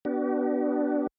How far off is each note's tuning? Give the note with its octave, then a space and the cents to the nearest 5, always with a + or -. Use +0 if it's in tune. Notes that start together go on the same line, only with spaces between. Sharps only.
B3 +0 D4 +0 F#4 +45